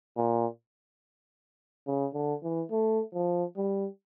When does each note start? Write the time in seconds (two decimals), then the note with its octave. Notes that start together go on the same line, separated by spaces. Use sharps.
0.17 A#2
1.87 C#3
2.14 D3
2.43 E3
2.71 A3
3.14 F3
3.57 G3